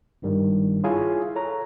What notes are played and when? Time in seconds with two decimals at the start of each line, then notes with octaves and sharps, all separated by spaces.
0.22 G#1 G2 D#3 G3
0.84 E4 F4 G#4 C#5 F5 G#5
1.35 A4 C#5 A#5